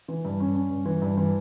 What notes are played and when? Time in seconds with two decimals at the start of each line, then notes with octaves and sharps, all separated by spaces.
0.08 E3
0.25 G2
0.40 C#4
0.55 C#4
0.70 G2
0.86 E3
1.02 G2
1.17 E3